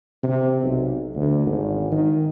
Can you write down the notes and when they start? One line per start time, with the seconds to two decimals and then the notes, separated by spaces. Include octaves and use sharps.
0.23 C3
0.63 B1
1.15 D2
1.47 G#1
1.92 D#3